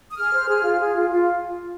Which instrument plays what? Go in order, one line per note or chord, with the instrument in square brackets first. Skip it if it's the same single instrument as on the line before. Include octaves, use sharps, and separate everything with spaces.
[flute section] D#6
G#4 F6
C5
G#4
F4
G#4
F4
F4